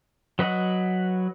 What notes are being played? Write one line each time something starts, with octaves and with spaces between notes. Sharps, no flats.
F#3 B4 D#5 F#5